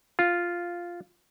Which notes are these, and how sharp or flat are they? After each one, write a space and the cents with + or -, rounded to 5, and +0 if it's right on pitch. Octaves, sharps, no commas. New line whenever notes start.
F4 -5